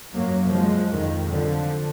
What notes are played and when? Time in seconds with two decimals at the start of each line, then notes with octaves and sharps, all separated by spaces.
0.14 F#2 F#3 A#3
0.52 F3 G#3
0.91 F2 D#3
1.29 D3 F3